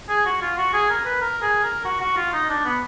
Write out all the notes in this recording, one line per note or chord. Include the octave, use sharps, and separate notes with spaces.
G#4
F#4
F4
F#4
G#4
A#4
B4
A#4
G#4
A#4
F#4
F#4
F4
D#4
D4
B3